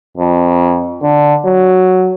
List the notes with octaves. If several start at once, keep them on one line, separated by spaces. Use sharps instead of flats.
F2
D3
F#3